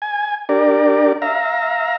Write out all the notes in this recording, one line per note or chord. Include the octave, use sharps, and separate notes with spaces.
G#5
D4 G4 A#4 D5
E5 F5 A#5